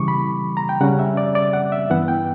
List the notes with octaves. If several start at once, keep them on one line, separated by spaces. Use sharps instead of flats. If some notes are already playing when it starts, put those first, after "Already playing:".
Already playing: C#3 E3 G3 C#6 D6
B5
A#5
G5
C#3 G3 C#4 F#5
E5
D5
D5
F#5
E5
G2 E3 B3 F#5
G5